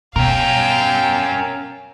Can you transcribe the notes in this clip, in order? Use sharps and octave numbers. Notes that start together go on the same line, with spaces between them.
B2 C#4 A#4 F5 G5